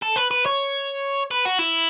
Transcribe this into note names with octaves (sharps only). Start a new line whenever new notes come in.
A4
B4
B4
C#5
B4
F#4
E4